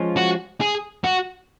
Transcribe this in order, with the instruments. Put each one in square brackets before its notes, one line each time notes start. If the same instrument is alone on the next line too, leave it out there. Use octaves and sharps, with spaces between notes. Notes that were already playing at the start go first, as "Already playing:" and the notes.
Already playing: [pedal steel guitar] F3 G#3 C#4 F4
[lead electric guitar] F#4
G#4
F#4